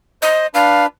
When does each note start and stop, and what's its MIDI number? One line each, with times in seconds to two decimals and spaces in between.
0.22 0.47 72
0.22 0.47 75
0.54 0.87 62
0.54 0.87 71
0.54 0.84 77